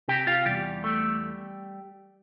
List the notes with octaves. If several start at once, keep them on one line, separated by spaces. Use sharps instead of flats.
C3 G4 G5
F4 F5
E2 G3 G4
A3